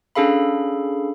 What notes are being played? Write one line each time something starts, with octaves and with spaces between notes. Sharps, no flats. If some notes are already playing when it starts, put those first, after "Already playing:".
C#4 D4 G#4 A4 F5 B5